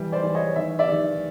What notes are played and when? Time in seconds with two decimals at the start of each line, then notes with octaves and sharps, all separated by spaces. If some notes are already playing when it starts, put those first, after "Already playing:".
Already playing: E3 G3
0.12 C5 D5
0.23 E3
0.35 C#5 D#5
0.56 D#3 E5
0.79 D5 E5
0.89 D#3